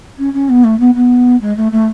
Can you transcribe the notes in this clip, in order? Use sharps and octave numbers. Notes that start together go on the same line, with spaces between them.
C#4
C#4
B3
A3
B3
B3
G#3
A3
A3